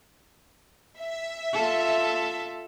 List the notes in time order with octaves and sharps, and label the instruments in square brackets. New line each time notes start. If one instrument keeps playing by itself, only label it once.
[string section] E5
[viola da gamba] F4 A4